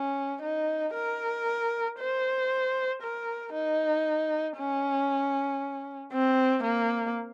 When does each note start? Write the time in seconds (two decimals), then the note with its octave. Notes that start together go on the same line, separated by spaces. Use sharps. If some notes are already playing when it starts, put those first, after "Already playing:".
Already playing: C#4
0.43 D#4
0.94 A#4
1.99 C5
3.02 A#4
3.53 D#4
4.57 C#4
6.13 C4
6.64 A#3